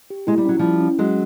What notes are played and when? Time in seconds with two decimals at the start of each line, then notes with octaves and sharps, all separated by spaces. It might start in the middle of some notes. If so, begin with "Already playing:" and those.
0.10 G4
0.27 G#3 E4
0.38 G3
0.45 F#3 C#4
0.59 F3 G3 E4
0.81 C#4
0.98 F#3 G#3 C#4